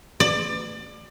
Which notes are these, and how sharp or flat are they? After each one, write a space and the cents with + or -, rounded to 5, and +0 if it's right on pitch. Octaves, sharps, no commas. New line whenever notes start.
D5 +25